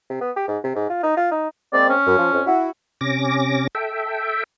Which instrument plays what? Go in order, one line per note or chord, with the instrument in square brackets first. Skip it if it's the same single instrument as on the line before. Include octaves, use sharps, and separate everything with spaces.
[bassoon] C3
B3
G4
G#2
C3
G#2
F4
D#4
F4
D#4
[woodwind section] G#3 A#3 C4 [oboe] D5
[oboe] C#4
[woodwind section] F#2
F3
F2
E4 F#4
[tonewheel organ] C3 C#4 D6 A#6
A4 E5 G5